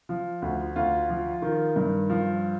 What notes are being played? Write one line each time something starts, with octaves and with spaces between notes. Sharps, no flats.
F3
D2
D2 F4
F3
D#3
G2
F3